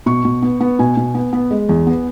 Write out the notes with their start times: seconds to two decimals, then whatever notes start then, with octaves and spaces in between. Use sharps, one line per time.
0.06 B2 C#6
0.25 B2
0.42 B3
0.61 B3
0.79 B2 G#5
0.97 B2
1.15 B3
1.33 B3
1.51 G#3
1.69 E2
1.87 B3